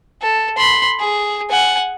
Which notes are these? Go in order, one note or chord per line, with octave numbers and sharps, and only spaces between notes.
A4
B5 C6
G#4
F#5 G#5